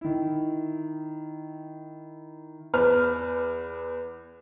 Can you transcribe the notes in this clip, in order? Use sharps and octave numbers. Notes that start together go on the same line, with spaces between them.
D#3 E4
E2 B4 F6